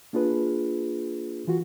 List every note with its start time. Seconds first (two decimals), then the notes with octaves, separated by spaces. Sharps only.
0.13 A#3 D4 F4 G#4 B4
1.48 E3 F4 F#4